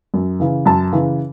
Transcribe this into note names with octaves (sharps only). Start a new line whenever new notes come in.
F#2
C#3 E3
F#2 A5
C#3 E3